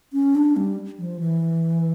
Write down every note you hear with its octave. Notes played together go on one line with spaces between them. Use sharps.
C#4
D4
G3
F3
E3